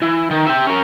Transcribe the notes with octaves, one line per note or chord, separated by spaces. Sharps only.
E3
D#3
G4 E5
C#4 A#4